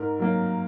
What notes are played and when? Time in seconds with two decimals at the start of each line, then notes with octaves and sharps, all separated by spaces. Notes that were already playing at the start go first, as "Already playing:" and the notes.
Already playing: G#2 A#4
0.20 F#3 A#3